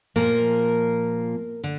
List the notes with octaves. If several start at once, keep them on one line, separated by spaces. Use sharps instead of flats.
A#2 F3 A#3 A#4
D3